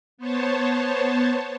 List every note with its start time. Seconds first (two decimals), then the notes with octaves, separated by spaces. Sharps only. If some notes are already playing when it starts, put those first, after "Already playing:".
0.18 B3 C5 C#5 A5